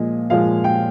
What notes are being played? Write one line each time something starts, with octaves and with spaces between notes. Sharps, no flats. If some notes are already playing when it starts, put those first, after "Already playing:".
Already playing: A#2 F3 G#3 D#5
A#2 F3 G#3 F5
G5